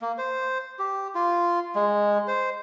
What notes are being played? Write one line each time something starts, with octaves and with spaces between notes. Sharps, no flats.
A#3
C5
G4
F4
G#3
C5